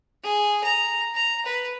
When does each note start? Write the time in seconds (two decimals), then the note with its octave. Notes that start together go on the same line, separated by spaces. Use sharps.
0.24 G#4
0.64 A#5
1.15 A#5
1.45 B4